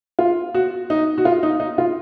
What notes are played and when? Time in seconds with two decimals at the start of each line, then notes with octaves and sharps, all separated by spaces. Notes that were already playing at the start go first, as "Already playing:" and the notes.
0.19 F4
0.54 F#4
0.90 D#4
1.18 F#4
1.25 F4
1.43 D#4
1.60 D#4
1.78 F4